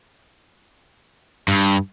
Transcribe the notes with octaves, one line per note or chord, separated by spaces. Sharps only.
G2